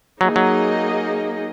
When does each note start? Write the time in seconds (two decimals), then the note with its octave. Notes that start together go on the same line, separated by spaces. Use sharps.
0.21 F#3 A#3 D#4 G#4 D#5
0.36 F#3